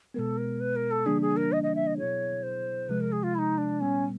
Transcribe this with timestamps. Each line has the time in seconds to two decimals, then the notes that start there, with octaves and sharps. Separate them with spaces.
0.14 B2 G#3 B3 A4 A#4
0.38 A#4
0.60 B4
0.76 A#4
0.91 A4
1.06 C#3 E3 G3 A#3 D4 G#4
1.21 G#4
1.37 A#4
1.52 D#5
1.63 D#5
1.75 E5
1.87 D#5
1.98 B2 F#3 B3 E4 G#4 C#5
2.43 C5
2.89 C3 F3 G#3 B4
3.01 A#4
3.12 G#4
3.23 F4
3.35 E4
3.39 D#4
3.58 D4
3.81 A#2 G3 B3 C#4